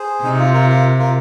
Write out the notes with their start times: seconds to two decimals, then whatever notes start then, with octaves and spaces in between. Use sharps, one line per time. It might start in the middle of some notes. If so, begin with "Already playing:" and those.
Already playing: G#4 C5
0.24 C3 D#4
0.39 F4
0.54 F4 A#4
0.69 F4 A#4
0.99 F4 A#4